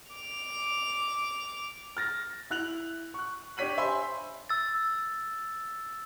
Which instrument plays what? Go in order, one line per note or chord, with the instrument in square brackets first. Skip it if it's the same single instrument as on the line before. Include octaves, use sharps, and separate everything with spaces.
[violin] D6 F7
[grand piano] F6 A6 A#6
E4 F#6 F7 F#7
C#6 F#6
D4 G4 C#5 B6 D#7 F#7
C5 E5 G#5 B5 C6
[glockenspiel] E6 A6